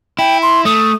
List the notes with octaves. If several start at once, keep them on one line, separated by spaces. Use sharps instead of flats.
E4 G5
C6
A3 D#6